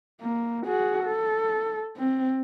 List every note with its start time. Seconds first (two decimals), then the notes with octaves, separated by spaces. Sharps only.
0.21 A#3
0.65 F#4 G#4
1.04 A4
1.97 C4